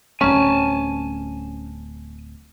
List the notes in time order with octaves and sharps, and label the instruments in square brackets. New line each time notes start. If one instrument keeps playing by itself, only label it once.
[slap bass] D1 G1 G3 [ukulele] C#4 [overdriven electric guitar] G#5 A5